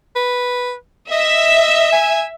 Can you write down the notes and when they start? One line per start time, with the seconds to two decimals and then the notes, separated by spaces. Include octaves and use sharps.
0.16 B4
1.11 D#5 E5
1.92 G#5